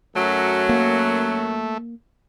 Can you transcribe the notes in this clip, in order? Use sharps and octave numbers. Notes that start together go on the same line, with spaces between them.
F#2 F#3 A3
A#3